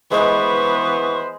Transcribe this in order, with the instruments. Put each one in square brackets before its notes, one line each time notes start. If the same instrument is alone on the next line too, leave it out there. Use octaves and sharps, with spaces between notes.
[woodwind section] E3 B3 [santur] G#3 [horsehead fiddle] B4 C5 [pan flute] C#6